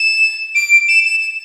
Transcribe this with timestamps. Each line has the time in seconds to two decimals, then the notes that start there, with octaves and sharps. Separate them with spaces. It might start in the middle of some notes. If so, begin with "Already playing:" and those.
Already playing: E7
0.55 D7
0.88 E7
1.05 E7
1.20 E7